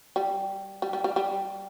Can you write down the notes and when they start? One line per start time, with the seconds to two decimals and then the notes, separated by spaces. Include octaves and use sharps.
0.16 G3
0.82 G3
0.93 G3
1.04 G3
1.16 G3